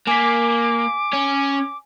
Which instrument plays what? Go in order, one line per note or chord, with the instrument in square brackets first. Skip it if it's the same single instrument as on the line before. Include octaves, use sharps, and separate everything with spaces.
[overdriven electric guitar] A#3 [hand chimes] G#5 B6 [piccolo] D6
[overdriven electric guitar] C#4